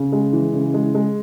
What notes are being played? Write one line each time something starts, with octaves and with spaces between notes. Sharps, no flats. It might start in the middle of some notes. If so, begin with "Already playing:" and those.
Already playing: C#3
G#3
E3
C#3
G#3
G#3